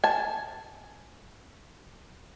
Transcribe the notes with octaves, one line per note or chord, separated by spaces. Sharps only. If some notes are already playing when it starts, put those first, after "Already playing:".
G#5 A5